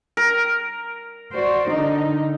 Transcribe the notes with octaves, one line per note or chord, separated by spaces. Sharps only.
A#4
F#4 C5 D5
D3 D#4